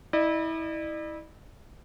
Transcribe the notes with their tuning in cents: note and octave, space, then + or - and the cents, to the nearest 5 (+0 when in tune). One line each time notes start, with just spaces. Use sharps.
E4 -25 D5 +45